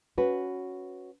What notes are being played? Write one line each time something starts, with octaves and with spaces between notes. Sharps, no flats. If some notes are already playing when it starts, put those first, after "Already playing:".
C#4 F#4 B4